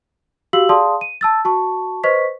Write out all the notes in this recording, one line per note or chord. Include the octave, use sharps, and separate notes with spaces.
F#4 G4 F5 E6 F#7
G#4 D5 F5 A5 C6 D#6
D#7
A5 E6 A6
F#4 A5 C#6
B4 C5 D#5 C#6 B6